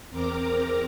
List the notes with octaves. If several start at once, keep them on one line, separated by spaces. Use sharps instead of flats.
E2 C4 A#4 A#5 D6